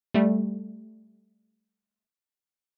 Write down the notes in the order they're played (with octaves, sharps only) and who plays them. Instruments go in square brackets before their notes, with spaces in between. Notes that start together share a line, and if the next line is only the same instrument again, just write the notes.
[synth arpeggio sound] G3 A3